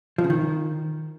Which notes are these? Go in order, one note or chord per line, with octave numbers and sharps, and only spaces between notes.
F3
C#3
D#3